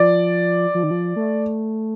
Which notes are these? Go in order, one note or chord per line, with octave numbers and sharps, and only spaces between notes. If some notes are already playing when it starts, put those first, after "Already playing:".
Already playing: F3 D5
F3
D#3
F3
A3